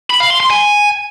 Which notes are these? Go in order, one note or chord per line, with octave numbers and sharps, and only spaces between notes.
B5
F5
C6
C6
G#5